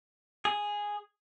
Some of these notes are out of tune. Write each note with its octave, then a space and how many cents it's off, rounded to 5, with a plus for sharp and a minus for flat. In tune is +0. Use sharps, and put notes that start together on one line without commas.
G#4 -5